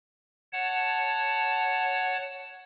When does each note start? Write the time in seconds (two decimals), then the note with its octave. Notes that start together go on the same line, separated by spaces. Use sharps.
0.53 C#5 F#5 A5